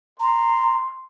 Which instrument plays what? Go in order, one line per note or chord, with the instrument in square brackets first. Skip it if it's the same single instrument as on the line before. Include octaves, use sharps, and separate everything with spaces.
[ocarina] A#5 [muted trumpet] C6